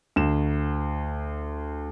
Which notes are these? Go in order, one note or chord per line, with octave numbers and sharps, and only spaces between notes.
D2 E7